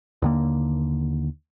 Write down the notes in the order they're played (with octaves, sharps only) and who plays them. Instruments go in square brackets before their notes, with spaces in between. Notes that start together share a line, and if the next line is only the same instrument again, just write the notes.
[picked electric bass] D#2 D3 A#3